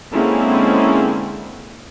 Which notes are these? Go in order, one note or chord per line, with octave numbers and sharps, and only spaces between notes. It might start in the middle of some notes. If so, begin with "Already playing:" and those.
D3 G#3 A#3 C4 C#4 E4